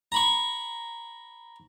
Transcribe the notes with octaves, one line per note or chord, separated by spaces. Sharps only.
A#5 B5 C#6